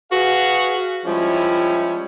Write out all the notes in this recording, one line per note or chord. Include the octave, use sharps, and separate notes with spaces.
F#4 G#4 B4 F5
F3 G3 G#3 C#4 E4